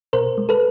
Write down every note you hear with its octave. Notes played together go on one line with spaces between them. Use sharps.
B2 A#4 C5
G#3
A4 B4